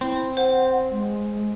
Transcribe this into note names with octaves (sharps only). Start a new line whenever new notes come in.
C4 E4
C5 F#5
G#3